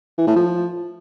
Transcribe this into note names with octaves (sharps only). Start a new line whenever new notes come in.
E3
A2
F3